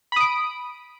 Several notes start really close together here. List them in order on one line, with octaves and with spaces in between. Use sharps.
B5 D#6 D7